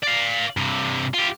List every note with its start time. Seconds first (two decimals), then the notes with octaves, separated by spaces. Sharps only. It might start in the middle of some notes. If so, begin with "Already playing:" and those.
0.03 D5 F5
0.57 G2 C3
1.14 F4 G4